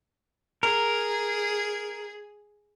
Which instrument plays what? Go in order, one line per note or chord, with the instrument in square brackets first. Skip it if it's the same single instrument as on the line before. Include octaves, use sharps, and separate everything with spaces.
[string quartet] G#4 [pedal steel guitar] A#4